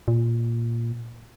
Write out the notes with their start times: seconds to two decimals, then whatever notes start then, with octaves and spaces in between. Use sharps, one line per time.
0.08 A#2